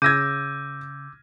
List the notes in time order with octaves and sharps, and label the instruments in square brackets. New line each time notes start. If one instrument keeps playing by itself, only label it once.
[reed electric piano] C#3 [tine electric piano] D6 E6 [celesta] G6 [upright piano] G#6 A#6 D#7